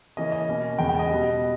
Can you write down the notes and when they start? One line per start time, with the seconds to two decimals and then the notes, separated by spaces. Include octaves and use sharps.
0.17 C#3 E3 A#3 C#4 D#5
0.32 D#5
0.48 B2 A#3 C#4
0.79 E2 C#3 G#3 B3 G5
0.89 G5
0.99 D#5
1.10 B2 G3 B3